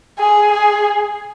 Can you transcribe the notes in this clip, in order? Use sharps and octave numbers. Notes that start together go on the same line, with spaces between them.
G#4
G#4